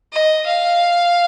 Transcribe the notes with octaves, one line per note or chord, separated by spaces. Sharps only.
D#5
F5